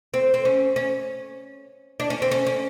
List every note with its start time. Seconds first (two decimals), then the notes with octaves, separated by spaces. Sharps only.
0.14 C4
0.34 C4
0.45 C#4
0.76 C#4
2.00 D4
2.10 C#4
2.22 C4
2.32 C#4
2.47 C#4